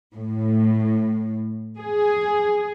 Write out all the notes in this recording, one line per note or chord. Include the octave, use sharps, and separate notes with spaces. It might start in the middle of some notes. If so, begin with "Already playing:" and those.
A2
G#4